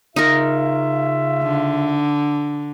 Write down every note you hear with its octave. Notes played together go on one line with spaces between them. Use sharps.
C#3 D#4 F4 A#4 E5
D3